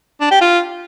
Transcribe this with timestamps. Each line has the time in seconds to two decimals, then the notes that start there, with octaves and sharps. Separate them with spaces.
0.21 D4
0.31 G4
0.41 F4